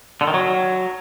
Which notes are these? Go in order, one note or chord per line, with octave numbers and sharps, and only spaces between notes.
D3
D#3
F#3